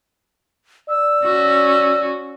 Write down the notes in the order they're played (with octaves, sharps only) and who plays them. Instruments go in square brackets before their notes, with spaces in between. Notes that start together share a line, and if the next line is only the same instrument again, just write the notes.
[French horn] D5 [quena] E6
[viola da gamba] C#4 F#4